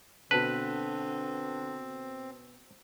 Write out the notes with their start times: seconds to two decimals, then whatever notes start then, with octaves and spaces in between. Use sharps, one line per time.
0.31 B2 D3 C4 B4 A5